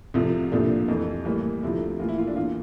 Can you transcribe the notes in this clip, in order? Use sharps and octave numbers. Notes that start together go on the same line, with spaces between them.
C2 C3 F3 A3
C2 A#2 F3 A3 D4
F2 E3 A3
A2 E3 G3 A#3
D2 C3 F3 A3 E4
A2 E3 A#3 F4
E4
F4
D4
E2 E3 A#3 F4